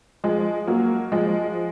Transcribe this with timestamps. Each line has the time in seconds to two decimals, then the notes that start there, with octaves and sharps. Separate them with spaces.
0.24 F3 G#3
0.67 F#3 A#3
1.12 F3 G#3